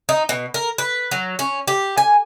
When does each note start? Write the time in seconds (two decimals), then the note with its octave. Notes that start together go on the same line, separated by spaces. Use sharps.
0.09 D#4
0.29 B2
0.54 A#4
0.78 B4
1.11 F#3
1.39 C#4
1.68 G4
1.98 G#5